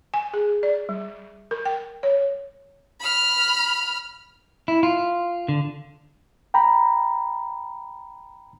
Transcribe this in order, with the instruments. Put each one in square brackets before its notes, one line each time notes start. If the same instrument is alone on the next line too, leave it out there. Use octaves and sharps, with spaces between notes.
[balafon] G#5
G#4
D5
G3
A#4
G5
C#5
[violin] B5 F6
[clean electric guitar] E4
F4
D3
[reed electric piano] G5 A#5 B5